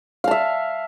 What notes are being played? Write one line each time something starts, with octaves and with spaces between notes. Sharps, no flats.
E5 F5 A5